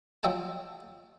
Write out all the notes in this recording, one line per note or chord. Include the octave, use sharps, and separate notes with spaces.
F3 F#3 D#5 E5 G5 A5